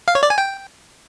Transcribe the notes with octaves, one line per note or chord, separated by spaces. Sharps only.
F5
C#5
D5
G#5
G5